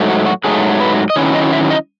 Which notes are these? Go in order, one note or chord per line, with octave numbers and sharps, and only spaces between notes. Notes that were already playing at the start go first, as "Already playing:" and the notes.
Already playing: G#2 F#3 A3
F#4
F#4
G#2 F#3 A3 G#4
B4
D#5
D#3 F#3 C#4 E4 C#5
D#5
E5
D#5